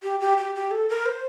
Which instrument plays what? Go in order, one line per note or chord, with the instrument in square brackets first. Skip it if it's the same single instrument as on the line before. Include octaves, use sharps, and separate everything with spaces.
[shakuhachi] G4
G4
G4
G4
A4
A#4
C5